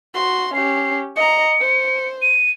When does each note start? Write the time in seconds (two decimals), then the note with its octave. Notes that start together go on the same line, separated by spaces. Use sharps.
0.14 F#4 C6
0.54 C#4 G4 C7
1.16 D#5 A#5 C#7
1.60 C5
2.22 D#7